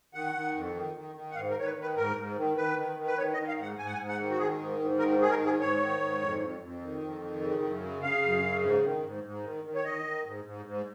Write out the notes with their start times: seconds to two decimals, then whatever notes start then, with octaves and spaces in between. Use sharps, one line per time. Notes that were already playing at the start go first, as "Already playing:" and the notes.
0.14 D#3 F#5
0.35 D#3
0.55 F2
0.75 D#3
0.95 D#3
1.15 D#3
1.31 F#5
1.35 G#2 F5
1.51 A#4
1.56 D#3 C#5
1.65 B4
1.77 D#3
1.82 B4
1.96 G#2 A#4
2.16 G#2
2.37 D#3
2.57 D#3 B4
2.77 D#3
2.97 D#3
3.07 B4
3.18 D#3 C#5
3.33 D#5
3.37 D#3
3.48 F5
3.57 G#2
3.62 F#5
3.78 G#2 G#5
3.86 F#5
3.93 G#5
3.98 G#2
4.08 F#5
4.19 D#3
4.30 F#4
4.38 D#3 G#4
4.59 G#2
4.79 G#2
4.99 D#3 A#4
5.19 D#3 G#4
5.30 A#4
5.39 G#2
5.45 G#4
5.60 G#2 C#5
5.80 D#3
6.00 G#2
6.21 F2
6.40 F2
6.61 F2
6.82 D#3
7.01 F2
7.22 D#3
7.41 C#3
7.62 F#2
7.82 C#3
8.03 C#3 F5
8.22 F#2
8.43 C#3
8.63 G#2
8.83 D#3
9.03 G#2
9.24 G#2
9.44 D#3
9.64 D#3
9.75 C#5
9.85 D#3 D#5
10.04 D#3
10.25 G#2
10.44 G#2
10.65 G#2